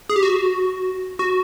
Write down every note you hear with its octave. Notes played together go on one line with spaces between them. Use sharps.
G#4
G4
F#4
F#4